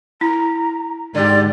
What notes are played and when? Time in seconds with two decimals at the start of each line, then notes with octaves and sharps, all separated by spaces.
0.21 E4 A#5
1.15 G#2 D3 G4 D5